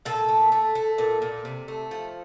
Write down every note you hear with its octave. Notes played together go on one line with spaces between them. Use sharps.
A#2 A4
A3
A3
A3
A#2
A#2
C3
A3
F3